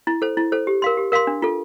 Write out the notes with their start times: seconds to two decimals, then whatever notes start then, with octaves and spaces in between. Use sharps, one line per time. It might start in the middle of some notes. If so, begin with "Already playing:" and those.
0.07 E4
0.22 A4 C5
0.37 E4
0.52 A4 C5
0.67 G4
0.82 A#4 F5 C6
0.97 G4
1.12 A#4 F5 C6
1.27 D4
1.42 F4 A4